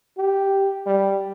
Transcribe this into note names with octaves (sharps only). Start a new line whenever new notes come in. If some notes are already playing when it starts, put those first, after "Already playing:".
G4
G3